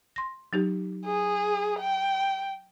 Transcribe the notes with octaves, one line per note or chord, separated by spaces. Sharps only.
C6 A#6
F#3 D#4 G4
G#4
G5